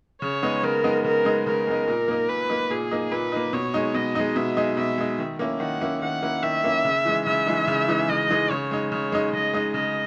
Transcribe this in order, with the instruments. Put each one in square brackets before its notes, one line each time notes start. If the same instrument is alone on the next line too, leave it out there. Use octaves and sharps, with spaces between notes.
[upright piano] C#3 [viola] C#5
[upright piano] G#3 B3 D#4
[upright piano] C#3 [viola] A#4
[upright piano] G#3 B3 D#4
[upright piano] C#3 [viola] A#4
[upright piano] G#3 B3 D#4
[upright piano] C#3 [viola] A#4
[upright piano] G#3 B3 D#4
A#2
A#3 D#4
[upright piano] A#2 [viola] B4
[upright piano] A#3 D#4
[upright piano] A#2 [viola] G#4
[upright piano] A#3 D#4
[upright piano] A#2 [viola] B4
[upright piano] A#3 D#4
[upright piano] B2 [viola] C#5
[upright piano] G#3 D#4
[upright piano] B2 [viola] D#5
[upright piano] G#3 D#4
[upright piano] B2 [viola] E5
[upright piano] G#3 D#4
[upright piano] B2 [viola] E5
[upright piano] G#3 D#4
D#3
A#3 C#4 E4
[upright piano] D#3 [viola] F#5
[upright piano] A#3 C#4 E4
[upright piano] D#3 [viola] F#5
[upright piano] A#3 C#4 E4
[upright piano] D#3 [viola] E5
[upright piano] A#3 C#4 E4
C#3
E3 G#3 D#4
[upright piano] C#3 [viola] E5
[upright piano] E3 G#3 D#4
C#3
E3 G#3 D#4
[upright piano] C#3 [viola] D#5
[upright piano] E3 G#3 D#4
[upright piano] C#3 [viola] C#5
[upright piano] G#3 D#4
[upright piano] C#3 [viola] C#5
[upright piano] G#3 D#4
[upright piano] C#3 [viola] D#5
[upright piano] G#3 D#4
[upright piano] C#3 [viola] D#5